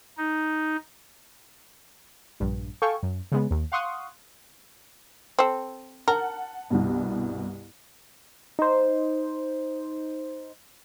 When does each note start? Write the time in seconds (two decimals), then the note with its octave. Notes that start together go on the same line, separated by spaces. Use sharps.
0.18 D#4
2.40 A#1 G2
2.82 A4 F5 G5 G#5 C#6
3.03 F#2
3.32 C#3 G#3 B3
3.51 D#2
3.72 F5 F#5 C6 C#6 D#6 F#6
5.39 C4 A4
6.08 A#4 F#5 A5
6.70 C2 G2 B2
8.59 D#4 C5